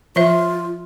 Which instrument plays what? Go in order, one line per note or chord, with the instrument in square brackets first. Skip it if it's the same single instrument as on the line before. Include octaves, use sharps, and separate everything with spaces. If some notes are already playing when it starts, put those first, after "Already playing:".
[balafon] F3 C5 E5 [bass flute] F4